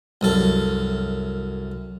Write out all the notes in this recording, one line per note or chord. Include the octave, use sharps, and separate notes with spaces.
C2 F#2 A4